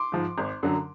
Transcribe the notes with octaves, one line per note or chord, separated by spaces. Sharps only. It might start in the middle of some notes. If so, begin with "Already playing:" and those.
Already playing: C6 D6
G#2 F3
G#1
F#2 D3 F#3